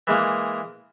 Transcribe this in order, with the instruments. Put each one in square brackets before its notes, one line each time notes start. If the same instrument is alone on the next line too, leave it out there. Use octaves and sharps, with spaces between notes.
[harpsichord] E3 G#3 A#3